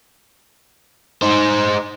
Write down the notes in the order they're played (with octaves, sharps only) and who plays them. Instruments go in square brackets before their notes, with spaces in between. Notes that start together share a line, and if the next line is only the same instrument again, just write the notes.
[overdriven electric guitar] D#4 C5